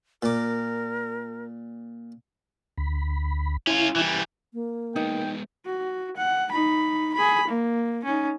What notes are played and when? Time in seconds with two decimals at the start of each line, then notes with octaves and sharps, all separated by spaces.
0.23 A#2 A#4 D6
2.78 D2 B5
3.67 C#4 E4 F4
3.96 E3 G3
4.54 A#3
4.96 G#3 B3 D#4 G5
5.65 F#4
6.17 F#5
6.52 D#4 B5
7.14 G#4 B5
7.48 A#3
8.04 C#4 D#4